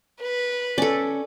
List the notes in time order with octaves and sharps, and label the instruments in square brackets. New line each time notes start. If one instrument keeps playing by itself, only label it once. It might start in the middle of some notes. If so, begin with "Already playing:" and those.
[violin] B4
[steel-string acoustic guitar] C#4 [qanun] A4 D5